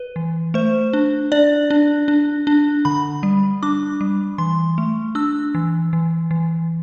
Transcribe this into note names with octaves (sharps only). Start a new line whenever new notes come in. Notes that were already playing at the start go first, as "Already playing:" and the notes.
Already playing: B4
E3
A3 C5
D4
D4 D5
D4
D4
D4
D3 B5
G3
D4 D6
G3
E3 C6
A3
D4 E6
E3
E3
E3